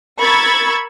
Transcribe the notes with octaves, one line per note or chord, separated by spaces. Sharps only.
A#4 B5 C#6 E6 G#6 A6